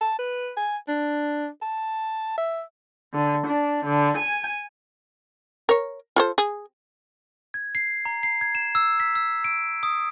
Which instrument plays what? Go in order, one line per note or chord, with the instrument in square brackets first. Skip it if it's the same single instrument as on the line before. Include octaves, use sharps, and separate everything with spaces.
[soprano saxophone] A5
B4
G#5
D4
A5
E5
[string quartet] D3
D4
D3
G#5
[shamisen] A#4 C#5
F4 A4 C5
G#4
[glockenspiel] G#6
C7
A#5
C7
G#6
E7
E6
B6
E6
D7
D#6